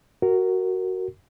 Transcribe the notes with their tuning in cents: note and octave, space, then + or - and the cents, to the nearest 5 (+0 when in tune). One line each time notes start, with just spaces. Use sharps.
F#4 +10 A#4 -10